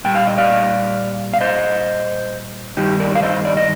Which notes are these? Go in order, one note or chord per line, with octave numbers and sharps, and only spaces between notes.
A#2 G3 G5
F5
D#5
D5 F5
F5
C5 D#5
G2 D#3 G3 D#4 G4
A#4 D5
F5
C5 D#5
D5
D#5